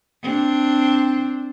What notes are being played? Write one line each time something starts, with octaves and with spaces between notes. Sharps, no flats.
C4 D4